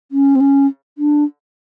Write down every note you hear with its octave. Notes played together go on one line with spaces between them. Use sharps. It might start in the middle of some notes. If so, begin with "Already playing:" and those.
C#4
C4
C#4
D4